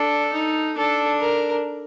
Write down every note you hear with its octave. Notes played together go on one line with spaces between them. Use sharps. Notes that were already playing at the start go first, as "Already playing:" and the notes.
Already playing: D4 A4
D#4
D4 A4
A#4